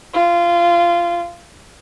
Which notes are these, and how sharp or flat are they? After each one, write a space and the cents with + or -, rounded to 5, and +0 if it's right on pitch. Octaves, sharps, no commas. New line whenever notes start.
F4 -20